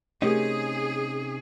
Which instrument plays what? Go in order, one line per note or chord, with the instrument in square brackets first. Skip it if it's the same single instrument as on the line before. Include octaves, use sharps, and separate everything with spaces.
[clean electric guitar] C3 C#4 D#4 [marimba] A3 G4 A#4 [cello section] G#4